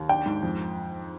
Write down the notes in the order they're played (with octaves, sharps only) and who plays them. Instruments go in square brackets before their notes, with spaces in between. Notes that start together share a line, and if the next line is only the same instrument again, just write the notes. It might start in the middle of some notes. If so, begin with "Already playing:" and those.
Already playing: [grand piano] D#2
D4 G5
G#2
F2